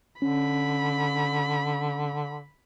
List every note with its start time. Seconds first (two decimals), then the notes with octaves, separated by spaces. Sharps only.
0.22 D3 C#4 B5